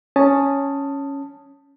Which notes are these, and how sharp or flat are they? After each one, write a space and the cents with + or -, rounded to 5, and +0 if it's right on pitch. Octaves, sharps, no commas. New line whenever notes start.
C#4 +0 A5 +10 D#6 +0